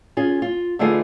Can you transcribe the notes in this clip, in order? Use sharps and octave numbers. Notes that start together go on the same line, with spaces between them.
C#4 F4 G#4
F4
D3 E3 A3 D#4 F4 G#4